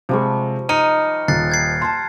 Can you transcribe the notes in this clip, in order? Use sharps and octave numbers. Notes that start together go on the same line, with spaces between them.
C3 F3 G3 G#3 C#6
D#4 F6 C#7 D#7
D#1 F#6 A6 C7
G6 G#6 C7
A5 A#5 C6